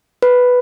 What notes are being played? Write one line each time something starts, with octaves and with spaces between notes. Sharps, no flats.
B4